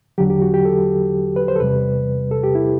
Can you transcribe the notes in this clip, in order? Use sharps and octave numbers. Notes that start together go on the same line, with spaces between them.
E2 D3 F#3 G4
G4
F#4
G4
A4
B4
C5
A4
E2 C3 G3 B4
A4
G4
E4